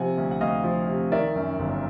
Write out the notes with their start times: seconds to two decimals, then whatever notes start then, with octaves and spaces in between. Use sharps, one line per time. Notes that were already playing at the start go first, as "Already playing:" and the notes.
Already playing: C3 F3 F#5 G#5
0.17 D2
0.31 F#5
0.41 D2 D#5 F5
0.64 F3
0.88 C3
1.12 D#3 D5 E5
1.35 F#2
1.59 G1